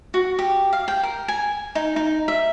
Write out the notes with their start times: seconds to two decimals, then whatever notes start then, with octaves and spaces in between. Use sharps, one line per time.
0.14 F#4
0.39 G4
0.73 F5
0.88 G5
1.03 A#4
1.28 G#5
1.75 D#4
1.96 D#4
2.28 E5